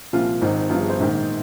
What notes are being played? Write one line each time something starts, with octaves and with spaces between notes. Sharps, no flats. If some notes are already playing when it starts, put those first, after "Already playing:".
C2 A#2 F3 F4
G#1 G#2 D#3 D#4
G1 G2 F3 F4
G#4
C5
A#1 G#2 D#3